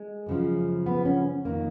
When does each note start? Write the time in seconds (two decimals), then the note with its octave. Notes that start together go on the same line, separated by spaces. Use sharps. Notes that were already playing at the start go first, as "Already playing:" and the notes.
Already playing: G#3
0.26 F#2 C#3 F3
0.86 B3
1.05 C#4
1.45 F2 D#3 A#3